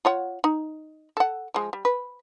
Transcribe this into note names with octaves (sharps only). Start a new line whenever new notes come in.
F4 C#5 F#5
D#4
A4 F#5
F3 G#3
G3
B4